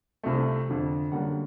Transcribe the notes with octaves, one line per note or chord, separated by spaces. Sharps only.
C2 C3 F3 A3
F2 D3 F3
F#2 D3 G3 A#3 F#5